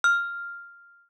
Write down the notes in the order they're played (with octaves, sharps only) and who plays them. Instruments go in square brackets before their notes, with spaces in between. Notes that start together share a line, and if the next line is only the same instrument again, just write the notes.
[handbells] F6